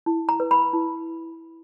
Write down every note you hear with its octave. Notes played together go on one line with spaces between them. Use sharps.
E4
A#5
B4
B5
E4